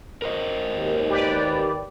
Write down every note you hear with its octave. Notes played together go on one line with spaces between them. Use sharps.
A#4 C5 D#5
D#2
G4 B4 D5